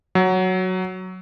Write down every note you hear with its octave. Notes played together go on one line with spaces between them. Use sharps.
F#3